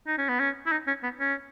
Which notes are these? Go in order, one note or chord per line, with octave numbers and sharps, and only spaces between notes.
D#4
C#4
B3
C#4
E4
D#4
C#4
B3
C#4